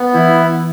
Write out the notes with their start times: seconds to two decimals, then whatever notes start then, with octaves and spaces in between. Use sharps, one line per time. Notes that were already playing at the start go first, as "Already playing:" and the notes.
Already playing: B3
0.14 E3 E4